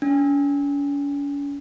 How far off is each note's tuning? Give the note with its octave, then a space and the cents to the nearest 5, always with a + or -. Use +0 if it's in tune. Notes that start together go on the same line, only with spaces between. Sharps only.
C#4 +45